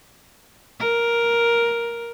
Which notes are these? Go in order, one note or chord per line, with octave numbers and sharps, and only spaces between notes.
A#4